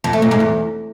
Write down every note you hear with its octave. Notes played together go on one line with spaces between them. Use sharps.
F2
A3
A#2
G#2
E2